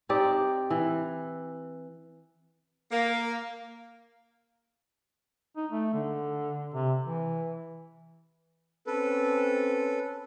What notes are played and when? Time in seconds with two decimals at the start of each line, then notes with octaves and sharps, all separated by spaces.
0.09 C4 D#4 G4 D5
0.70 E3
2.91 A#3
5.56 D#4
5.71 A3
5.93 D3
6.74 C3
7.05 E3
8.87 C4 C#4 A4 B4